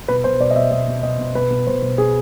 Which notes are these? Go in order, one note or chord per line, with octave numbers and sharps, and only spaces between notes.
B2 B4
B2 C5
B2 D5
D#5
B2 E5
B2 D#5
B2
B2 D#5
B2
B2 B4
B2
B2 C5
B2
B2 G#4